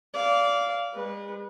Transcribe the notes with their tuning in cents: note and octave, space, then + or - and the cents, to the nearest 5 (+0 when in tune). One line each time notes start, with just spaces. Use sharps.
D5 -25 F5 -5
G#3 -45 B4 -25